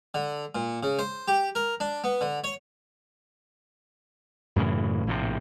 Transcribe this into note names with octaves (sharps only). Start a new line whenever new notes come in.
D3
A#2
C#3
C5
G4
A#4
D4
B3
D3
C#5
F#2 A2 C#3 E3
A#1 A2 C3